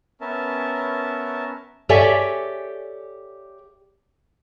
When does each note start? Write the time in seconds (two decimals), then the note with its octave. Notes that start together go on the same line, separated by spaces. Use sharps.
0.21 B3 C#4 A#4 E5 A5
1.89 G4 A4 C#5 D5 E5 G#5